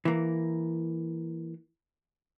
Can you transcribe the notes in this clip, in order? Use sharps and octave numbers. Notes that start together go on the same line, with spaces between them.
E3 A#3